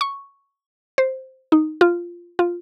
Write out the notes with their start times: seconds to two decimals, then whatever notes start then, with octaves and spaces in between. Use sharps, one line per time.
0.01 C#6
0.98 C5
1.52 D#4
1.81 F4
2.39 F4